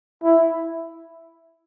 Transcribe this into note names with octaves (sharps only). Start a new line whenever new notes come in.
E4